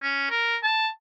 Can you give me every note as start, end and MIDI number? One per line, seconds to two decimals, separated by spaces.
0.02 0.26 61
0.30 0.57 70
0.63 0.88 81